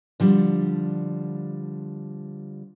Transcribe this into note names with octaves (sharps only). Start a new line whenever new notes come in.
D3 F3 G3